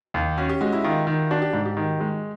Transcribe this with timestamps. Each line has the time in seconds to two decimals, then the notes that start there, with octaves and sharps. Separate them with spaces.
0.14 D#2
0.38 C#4 F#4
0.49 G4
0.61 G#3 F#4
0.73 E4
0.84 D#3 F4
1.07 D#3
1.31 D4 F#4
1.42 G4
1.53 G#2 G4
1.65 G4
1.77 D#3
2.00 G#3